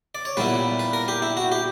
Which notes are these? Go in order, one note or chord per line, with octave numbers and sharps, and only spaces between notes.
D5
C#5
A#2 G3 B3 E4 B4
B4
A#4
G4
E4
F#4
G4